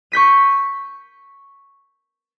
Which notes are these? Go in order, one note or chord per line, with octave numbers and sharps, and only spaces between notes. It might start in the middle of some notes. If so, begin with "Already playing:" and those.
C#6 G6 B6 D#7